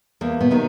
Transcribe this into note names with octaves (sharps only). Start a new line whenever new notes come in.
E2 A#3
B2 B3
C3 D#3 F#3